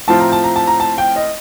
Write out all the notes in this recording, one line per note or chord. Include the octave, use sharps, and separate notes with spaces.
A2 F3 C4 F4 A5
A#5
A5
A#5
A5
A#5
A5
G5
D#5